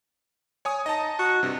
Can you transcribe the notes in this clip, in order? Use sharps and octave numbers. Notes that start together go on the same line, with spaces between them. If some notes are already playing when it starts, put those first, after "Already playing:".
C#5 G#5 D#6
D#4 D#5 A5
F#4
G2 C3